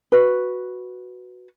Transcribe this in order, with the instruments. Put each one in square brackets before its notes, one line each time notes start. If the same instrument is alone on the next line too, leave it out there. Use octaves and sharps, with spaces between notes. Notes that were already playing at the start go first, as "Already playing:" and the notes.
[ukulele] F#4 B4